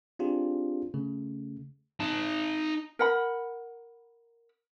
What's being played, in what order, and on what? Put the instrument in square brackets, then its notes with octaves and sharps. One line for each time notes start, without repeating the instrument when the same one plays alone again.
[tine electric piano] C4 D4 F4 G4 G#4
C#3 A3
[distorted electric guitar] D#4 A5
[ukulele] A#4 F#5 B5